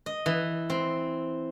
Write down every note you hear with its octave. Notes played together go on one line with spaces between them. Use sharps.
D#5
E3
C4